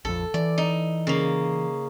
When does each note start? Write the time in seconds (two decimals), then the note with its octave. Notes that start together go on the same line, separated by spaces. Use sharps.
0.05 A#1 F2 A4
0.34 E3 D5
0.58 D#4
1.07 C#3 A#3